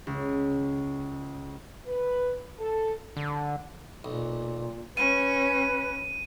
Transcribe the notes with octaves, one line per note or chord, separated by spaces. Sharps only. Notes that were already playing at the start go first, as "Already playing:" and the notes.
C#2
B4
A4
D3
B1 A#2
C#4 B4 F5 D#7